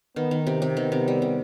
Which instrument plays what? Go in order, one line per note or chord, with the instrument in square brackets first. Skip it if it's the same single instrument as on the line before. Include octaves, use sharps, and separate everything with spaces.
[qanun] D#3 [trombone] B3
[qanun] D#3
C3
C3
[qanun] D#3 [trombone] B3
[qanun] C3
G3
C3